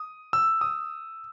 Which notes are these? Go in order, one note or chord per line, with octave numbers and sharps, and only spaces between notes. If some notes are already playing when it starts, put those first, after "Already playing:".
Already playing: D#6
E6
D#6